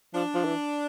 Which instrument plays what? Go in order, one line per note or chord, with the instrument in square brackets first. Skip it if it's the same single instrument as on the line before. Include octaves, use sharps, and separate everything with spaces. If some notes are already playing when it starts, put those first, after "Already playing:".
[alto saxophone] F3 [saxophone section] D4
[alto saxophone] F3
E3